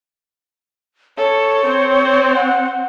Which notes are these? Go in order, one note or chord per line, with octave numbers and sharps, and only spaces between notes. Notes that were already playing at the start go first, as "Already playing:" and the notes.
A4 C#5
C4 C5
F#5